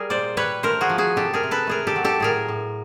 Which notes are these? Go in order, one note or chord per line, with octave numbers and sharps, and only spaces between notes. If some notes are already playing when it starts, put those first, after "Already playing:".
Already playing: G3 G#4 A#4
A#2 C5 D5
G3 B4 C#5
A3 A#4 C5
F#4 G#4
F3
F#4 G#4
C3 G4 A4
G#4 A#4
C3
A4 B4
A3 G#4 A#4
G4 A4
F#3
G4 A4
A2 G#4 A#4
A2